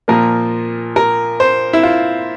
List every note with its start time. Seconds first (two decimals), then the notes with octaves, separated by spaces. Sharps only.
0.08 A#2 F3 A#3 A#4
0.96 A#4
1.40 C5
1.73 E4
1.83 F4